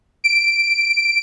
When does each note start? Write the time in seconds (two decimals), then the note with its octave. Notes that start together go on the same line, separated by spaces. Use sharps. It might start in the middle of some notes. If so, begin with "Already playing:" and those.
0.24 D7